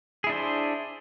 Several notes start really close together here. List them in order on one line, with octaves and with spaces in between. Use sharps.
G#4 E4 D4 C5